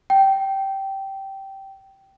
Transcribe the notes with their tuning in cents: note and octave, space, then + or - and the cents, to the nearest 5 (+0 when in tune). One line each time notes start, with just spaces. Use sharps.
G5 -15